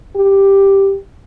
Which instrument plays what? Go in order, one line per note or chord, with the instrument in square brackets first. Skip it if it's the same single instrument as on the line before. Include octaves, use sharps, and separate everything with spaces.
[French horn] G4